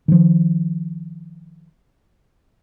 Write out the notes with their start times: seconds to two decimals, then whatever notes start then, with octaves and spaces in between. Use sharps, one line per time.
0.08 D#3 F3